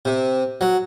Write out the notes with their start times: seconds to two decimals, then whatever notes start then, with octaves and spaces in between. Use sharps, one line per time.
0.05 C3
0.61 F#3